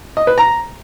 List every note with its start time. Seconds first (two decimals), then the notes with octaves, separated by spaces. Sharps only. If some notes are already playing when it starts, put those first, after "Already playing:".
0.17 D#5
0.27 B4
0.38 A#5